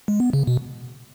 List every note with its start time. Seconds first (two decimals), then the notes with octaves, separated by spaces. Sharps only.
0.08 G#3
0.20 B3
0.33 C#3
0.47 B2